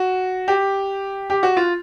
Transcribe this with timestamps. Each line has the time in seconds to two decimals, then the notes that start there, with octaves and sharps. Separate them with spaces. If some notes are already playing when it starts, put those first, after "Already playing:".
Already playing: F#4
0.48 G4
1.30 G4
1.43 F#4
1.57 F4